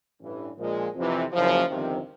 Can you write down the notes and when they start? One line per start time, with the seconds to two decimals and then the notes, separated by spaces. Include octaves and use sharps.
0.20 A1 G2 E3
0.57 A#1 A#2 F3 G#3
0.94 F2 C3 E3
1.32 F#1 F#2 C#3 F3
1.69 G1 F2 C3 D#3